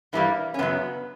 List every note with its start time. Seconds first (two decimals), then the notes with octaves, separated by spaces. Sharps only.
0.13 G2 E3 G3 A#3
0.54 C#4
0.59 F#2 C#3 F#3 B3